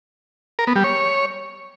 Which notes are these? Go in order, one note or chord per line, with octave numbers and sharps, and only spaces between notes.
A#4
B3
G3
C#5